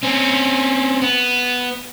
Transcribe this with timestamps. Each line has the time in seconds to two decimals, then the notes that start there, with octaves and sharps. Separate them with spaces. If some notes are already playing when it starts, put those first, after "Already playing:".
0.03 C4 C#4
1.02 B3